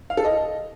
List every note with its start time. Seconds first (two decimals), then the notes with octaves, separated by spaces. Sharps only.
0.10 F5
0.17 A4
0.25 D#5